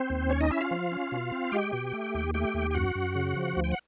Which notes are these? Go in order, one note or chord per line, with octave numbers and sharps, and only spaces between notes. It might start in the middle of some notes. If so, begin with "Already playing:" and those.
Already playing: C4 C5
D#2
C#4 C#5
D#4 D#5
C#4 E4 E5
F4 F5
F3
C#4
B2
C4
G#3 G4 G5
B2
A3
D#2
A3 G4 G5
D#2
G5
F#2 F#4 F#5
F#2
C#3
F3
D2
G5
F#5